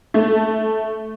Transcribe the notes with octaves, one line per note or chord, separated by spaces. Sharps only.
A3